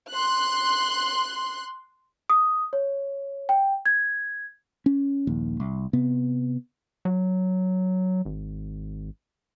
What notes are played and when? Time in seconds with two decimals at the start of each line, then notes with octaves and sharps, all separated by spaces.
0.11 C6 F#6
2.30 D#6
2.73 C#5
3.49 G5
3.86 G#6
4.86 C#4
5.27 D#1 A#1 D#2
5.60 C2
5.93 C3 B3
7.05 F#3
8.25 G#1